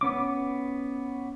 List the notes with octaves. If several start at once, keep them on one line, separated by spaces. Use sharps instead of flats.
B3 C#4 D6